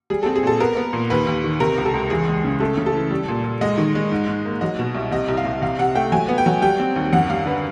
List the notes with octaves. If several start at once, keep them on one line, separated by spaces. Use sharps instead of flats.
G3 G#4
C4 A4
G#4
A#2 A4
B3 A#4
B3
A#2
D#2 B4
D#2
D#3
C3 A#4
C#2
A4
C#2
E2 G#4
G#3
C#3
A3 A4
C#3
A4
E3
G3
A#2
A#2
G#3 D#5
D#3
G#3
G#2
G#2
A#3
F#3 D#5
B2
C2
C3 D#5
C2
F5
C2
C3 F5
C3 F#5
A3 G5
F#3 G#5
B3
G5
F#3
G3 G5
C4
D#2
F#2 F#5
G3 F5
D3 B4